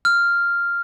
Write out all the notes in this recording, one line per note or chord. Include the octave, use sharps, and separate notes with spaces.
F6